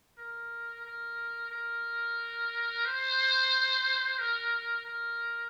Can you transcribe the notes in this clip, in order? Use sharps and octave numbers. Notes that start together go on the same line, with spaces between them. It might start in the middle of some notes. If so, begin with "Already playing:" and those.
A#4
A#4
A#4
C5
A#4
A#4